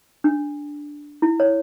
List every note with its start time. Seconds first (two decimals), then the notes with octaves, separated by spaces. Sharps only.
0.24 D4
1.22 E4
1.40 C#5